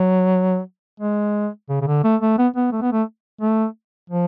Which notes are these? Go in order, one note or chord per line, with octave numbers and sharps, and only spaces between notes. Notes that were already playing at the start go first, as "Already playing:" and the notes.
Already playing: F#3
G#3
C#3
C#3
D3
A3
A3
B3
B3
A3
B3
A3
A3
F3